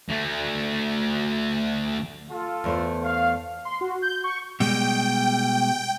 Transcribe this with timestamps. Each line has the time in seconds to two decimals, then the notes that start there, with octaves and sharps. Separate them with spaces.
0.09 D2 A3
2.30 F4 A4
2.64 E2 A3 C5
3.03 F5
3.65 C6
3.81 F#4
4.02 G6
4.24 C#6
4.60 B2 G3 G#3 G5